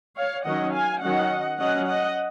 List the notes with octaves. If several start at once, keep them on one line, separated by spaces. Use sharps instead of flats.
C#5 F5
D#3 F#3 C#4 D#5 F#5
F5 G#5
D#3 F#3 C#4 D#5 F#5
F#3 C#4 D#5 F#5
D#5 F#5